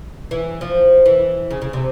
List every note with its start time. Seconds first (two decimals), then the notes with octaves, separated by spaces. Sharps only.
0.31 E3
0.61 F3
1.06 E3
1.51 C#3
1.62 C#3
1.73 C3